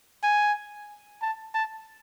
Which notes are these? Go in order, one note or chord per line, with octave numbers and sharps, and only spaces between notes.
G#5
A5
A5